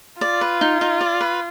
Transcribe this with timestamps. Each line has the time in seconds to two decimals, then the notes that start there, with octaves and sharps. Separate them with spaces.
0.21 F4 D5
0.41 B4
0.61 D#4
0.81 D#4
1.01 D5
1.21 B4